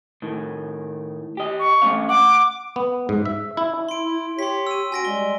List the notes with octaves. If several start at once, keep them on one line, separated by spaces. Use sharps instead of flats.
A2 D#3
G4 D#5
C#6
A3 C#4 F5
F#5 D6
B3
G#2
E5
E4
E4 C6 D7
E4
G4 C#5 C6 B6
E6 D#7
C#4 F#4 G#5 A#6 D7
G3 G#3 G7